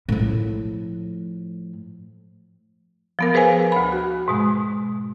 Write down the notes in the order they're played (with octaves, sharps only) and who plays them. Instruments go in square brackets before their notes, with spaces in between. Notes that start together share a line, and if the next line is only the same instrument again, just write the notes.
[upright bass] A2 F3
[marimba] F3 B3 A#4
G#4 B4 C5 F5 G#5
D2 B5
F#4
G#2 B2 G#3